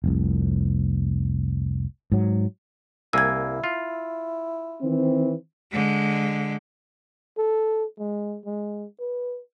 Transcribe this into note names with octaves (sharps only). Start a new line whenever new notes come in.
F1 C2
G#2 F#3
C2 A#3 E4 G#5 E6 G#6
F4
D#3 E3 C4
D3 G#3
A4
G#3
G#3
B4